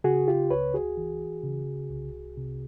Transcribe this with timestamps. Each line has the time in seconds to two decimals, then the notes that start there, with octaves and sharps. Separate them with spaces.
0.04 C#3 F#4 G#4
0.28 F4 G4
0.50 C#2 B4 C#5
0.74 F#4 G#4
0.97 E3
1.44 C#3
1.90 C2
2.37 C3